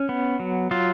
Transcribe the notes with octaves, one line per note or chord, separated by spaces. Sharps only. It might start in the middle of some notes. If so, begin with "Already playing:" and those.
Already playing: C#4
B3
F#3
F#3 F4